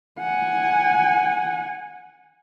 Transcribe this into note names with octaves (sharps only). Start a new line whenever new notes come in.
F#5 G#5